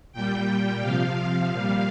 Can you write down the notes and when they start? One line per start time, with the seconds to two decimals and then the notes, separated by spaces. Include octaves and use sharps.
0.13 A#2 G3 G5
0.47 G5
0.81 C3 F3 F5
1.49 A#2 F5
1.54 G3